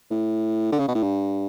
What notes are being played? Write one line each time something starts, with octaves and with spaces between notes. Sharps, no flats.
A2
D3
C#3
B2
A2
G2